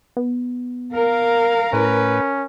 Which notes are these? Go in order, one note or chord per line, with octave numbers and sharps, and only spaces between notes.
B3
A#4 F5
A2 C#4 B4